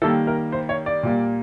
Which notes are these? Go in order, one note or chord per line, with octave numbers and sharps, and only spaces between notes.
D#3 G3 A#3 A4
A#4
C5
C#5
D5
A#2 G3 A#3